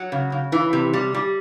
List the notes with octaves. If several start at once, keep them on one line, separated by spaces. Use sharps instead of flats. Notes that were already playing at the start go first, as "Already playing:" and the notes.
Already playing: F#3 F#5
C#3
C#3
E3
C3
G3
G3